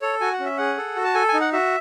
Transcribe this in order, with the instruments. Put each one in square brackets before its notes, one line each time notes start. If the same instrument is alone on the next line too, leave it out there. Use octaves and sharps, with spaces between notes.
[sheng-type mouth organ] A4 C#5
F#4 G#5
F#5
C#4
E5
G#4 F#5
A4
F#4
A5
A4 G#5
G#5
D#4
F#5
F#4 E5